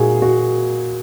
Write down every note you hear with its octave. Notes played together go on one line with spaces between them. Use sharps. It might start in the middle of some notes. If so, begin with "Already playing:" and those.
Already playing: A#2 G#3 D#4 F#4 G#4
F#4